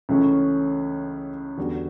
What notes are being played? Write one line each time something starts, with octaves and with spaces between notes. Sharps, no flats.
C#2 C#3 E3 A3 C#4
E2 D3 G3 B3 F#4